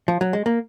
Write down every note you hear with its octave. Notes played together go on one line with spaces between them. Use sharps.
F3
F#3
G#3
A#3